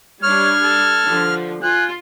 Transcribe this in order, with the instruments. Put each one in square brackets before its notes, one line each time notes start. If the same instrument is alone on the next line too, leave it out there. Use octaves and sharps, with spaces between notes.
[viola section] G3 D4 [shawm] C#5 [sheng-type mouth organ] F6 [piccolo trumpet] G#6
[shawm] A4
[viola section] D3 F3
[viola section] F4 [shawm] G#5 [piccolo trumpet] F#6